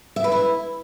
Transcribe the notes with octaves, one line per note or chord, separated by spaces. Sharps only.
E5
B4
E4